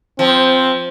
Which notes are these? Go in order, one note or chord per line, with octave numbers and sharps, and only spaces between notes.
F3 C4